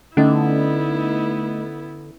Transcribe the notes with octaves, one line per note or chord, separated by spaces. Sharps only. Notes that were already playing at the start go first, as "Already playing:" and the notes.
D3 A3 B3 C#4 D#4 E4 D#5